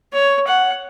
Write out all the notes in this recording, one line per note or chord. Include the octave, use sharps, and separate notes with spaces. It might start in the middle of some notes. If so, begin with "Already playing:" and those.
C#5
F#5